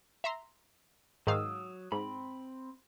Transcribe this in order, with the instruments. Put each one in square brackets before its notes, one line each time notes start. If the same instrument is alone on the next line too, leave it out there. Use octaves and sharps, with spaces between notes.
[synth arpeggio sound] E5 A#5 C6
[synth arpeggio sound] G#2 D#3 F5 [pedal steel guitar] F#3 D#6 E6
[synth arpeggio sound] G#2 [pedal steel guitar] C4 B5